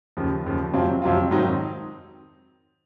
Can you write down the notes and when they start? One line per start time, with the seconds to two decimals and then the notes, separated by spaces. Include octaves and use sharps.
0.17 D#2 C#3 F3
0.46 D#2 C#3 F3
0.73 F2 C3 F#3 C4 F4
1.02 F2 C3 F#3 C4 F4
1.31 G#2 D#3 F#3 C4 D#4